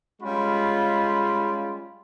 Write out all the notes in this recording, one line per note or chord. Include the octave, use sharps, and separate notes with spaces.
G3 G#3 C#4 F4 B5